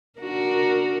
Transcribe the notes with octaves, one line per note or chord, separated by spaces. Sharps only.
D4 F#4 A#4